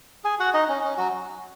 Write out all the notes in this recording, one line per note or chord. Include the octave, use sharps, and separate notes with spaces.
G#4 G#5
F#4 F#5
D#4 D#5
C#4
C#4
F#3 F#4